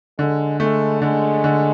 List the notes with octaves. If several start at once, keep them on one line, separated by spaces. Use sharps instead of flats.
D3 G#3
G#3 A3
D3 G#3
D3